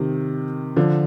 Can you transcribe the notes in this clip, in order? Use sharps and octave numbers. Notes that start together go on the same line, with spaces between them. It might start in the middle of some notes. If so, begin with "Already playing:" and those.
Already playing: C3 D#3
D3 F3